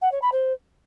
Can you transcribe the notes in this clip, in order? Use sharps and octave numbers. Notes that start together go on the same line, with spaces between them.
F#5
C#5
B5
C5